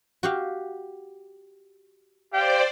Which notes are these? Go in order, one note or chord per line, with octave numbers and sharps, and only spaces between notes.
F#4 G4 F5
G4 C5 D5 F5 G5